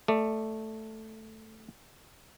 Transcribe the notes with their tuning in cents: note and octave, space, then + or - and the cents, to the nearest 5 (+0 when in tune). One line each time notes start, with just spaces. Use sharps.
A3 +0 D5 +20